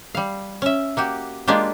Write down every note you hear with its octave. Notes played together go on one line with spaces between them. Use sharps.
G3 F5
C#4 E5
A#3 F#4 G4
G#3 A#3 D4 F4 G4